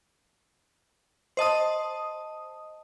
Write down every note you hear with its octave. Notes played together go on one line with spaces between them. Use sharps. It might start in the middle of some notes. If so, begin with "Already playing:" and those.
C5 D#5 A5 D#6